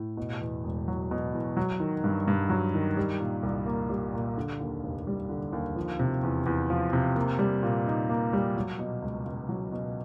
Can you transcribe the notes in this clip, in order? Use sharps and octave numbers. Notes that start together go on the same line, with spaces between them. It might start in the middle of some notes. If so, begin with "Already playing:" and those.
Already playing: A2
B2
E2
E1
F#3
B2
E2
F#3
D#3
G2
G2
F#3
D#3
G3
A#2
C2
A#3
G3
A#2
D3
D#2
F1
G3
D3
D#2
F3
C3
E2
E2
F3
C3
A#3
G3
A#2
D#4
A#3
G3
F#3
B2
C#2
C#2
F#3
B2